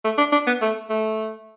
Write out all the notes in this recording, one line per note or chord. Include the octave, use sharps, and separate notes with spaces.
A3
D4
D4
B3
A3
A3